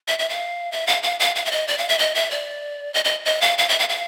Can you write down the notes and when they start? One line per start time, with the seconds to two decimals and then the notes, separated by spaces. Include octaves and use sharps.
0.08 E5
0.19 E5
0.29 F5
0.72 E5
0.87 F5
1.03 F5
1.20 F5
1.36 F5
1.45 E5
1.51 D#5
1.68 D5
1.78 F5
1.89 E5
1.99 D#5
2.15 E5
2.31 D5
2.94 D#5
3.05 D#5
3.25 D#5
3.41 F5
3.58 F5
3.69 E5
3.79 F5
3.89 F5